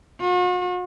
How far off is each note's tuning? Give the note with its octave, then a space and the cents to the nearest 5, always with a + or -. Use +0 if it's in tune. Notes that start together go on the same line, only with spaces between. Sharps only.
F#4 -45